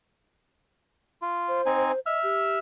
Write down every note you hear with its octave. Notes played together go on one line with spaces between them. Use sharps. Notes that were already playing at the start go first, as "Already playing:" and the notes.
F4
C5
C4 D#4 G#5
D#5 E5 E6 F6
G4